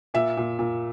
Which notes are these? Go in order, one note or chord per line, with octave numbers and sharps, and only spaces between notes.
A#2 E5
A#2
A#2